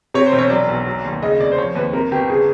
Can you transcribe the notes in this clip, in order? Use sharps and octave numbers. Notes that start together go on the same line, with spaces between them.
C3 C#5
C5
E1
C#5
F#3 D5
B1
F#3
D#2
C#3 D#5
F1 D5
C5
F3 C#5
D#2 B4
C3 A#4
G1 G4
C#3 G#4